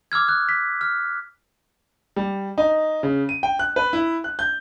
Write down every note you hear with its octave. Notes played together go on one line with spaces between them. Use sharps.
D6 E6 F6 G#6
F#6
B6
F6
G3
D#4
C#3
D#7
G5
F#6
B4
E4
F#6
G6